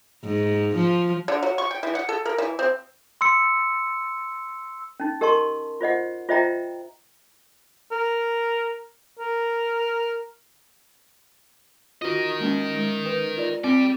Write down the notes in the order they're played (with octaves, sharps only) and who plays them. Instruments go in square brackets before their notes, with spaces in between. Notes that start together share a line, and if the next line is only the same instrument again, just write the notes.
[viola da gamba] G#2
F3
[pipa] D3
F#3
C#6
G5
E3
F#5
A4
A#4
E3
C4
[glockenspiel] C6 E6 C#7
[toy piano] C#4 D#4
G4 A#4 D#5 A5 C6 C#6
F4 C5 D#5 F#5
F4 C5 D#5 E5 G5 A#5
[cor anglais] A#4
A#4
[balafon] F4 F#4 [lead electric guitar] A#4 D#5
[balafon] G#3 A#3 C#4
G#3
B4
F4 D5
[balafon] C4 [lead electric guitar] G4 D5